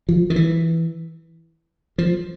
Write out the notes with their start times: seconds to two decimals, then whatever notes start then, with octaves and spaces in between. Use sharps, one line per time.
0.09 F3
0.30 D#3
0.36 E3
1.98 F3